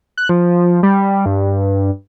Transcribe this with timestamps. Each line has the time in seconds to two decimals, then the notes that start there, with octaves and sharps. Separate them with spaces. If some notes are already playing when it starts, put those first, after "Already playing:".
0.18 F#6
0.29 F3
0.83 G3
1.26 G2